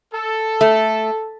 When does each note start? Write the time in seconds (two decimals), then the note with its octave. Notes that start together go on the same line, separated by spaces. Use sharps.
0.14 A4
0.61 A3